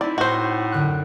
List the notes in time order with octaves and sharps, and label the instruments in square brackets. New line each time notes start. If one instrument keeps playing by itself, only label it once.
[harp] C4 D#4 [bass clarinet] E4 [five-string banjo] D5
[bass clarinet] A2 [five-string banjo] F#4 C5
[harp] F#2 D3 F#6